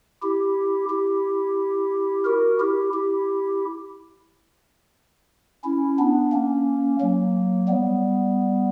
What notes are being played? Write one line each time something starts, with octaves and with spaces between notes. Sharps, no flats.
E4 G4
E4 G4
F#4 A#4
E4 G4
E4 G4
C#4 E4
B3 D4
A#3 C#4
F#3 A#3
G3 B3